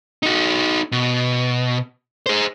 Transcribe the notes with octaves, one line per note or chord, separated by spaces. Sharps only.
D#4 F#4
B2
G#4 C5